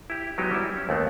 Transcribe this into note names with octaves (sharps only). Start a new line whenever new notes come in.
E4 G4
F#3 G#3 B3 D#4 G4
G3 E4
C#4
D#2 A3 B3 C4